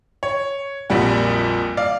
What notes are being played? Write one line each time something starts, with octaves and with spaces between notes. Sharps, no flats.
C#5
A#1 F2 A#2 G3 F#4
D5 F5